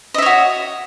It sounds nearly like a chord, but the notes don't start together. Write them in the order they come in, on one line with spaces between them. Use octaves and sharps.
D#5 E5 C#5 F#4